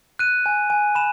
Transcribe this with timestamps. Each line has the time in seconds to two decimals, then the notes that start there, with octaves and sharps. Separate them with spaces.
0.19 F#6 D#7
0.46 G#5
0.70 G#5
0.95 B5 E7